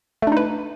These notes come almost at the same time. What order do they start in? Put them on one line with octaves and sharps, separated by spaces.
A3 D4 D#4 B4